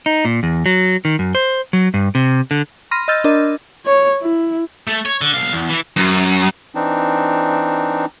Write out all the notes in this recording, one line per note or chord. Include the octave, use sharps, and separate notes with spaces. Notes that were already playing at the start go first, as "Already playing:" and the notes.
D#4
A#2
E2
F#3
D#3
F#2
C5
F#3
G2
C3
D3
B5 C6 F6 A#6 D#7
D#5 E6 F6 G6 A6
D4 A#4 D#5
C#5
E4
A3
C#5
D3
B1 F5
E2
E3
F#2
E3 C4 D4 D#4